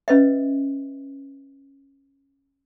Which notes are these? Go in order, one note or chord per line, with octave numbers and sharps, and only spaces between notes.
C#4 B4 D#5 E5